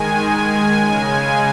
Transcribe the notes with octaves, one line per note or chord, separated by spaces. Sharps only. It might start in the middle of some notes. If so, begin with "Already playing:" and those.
Already playing: D#3 G#3 G#5
G#5
C#3 G#3 G#5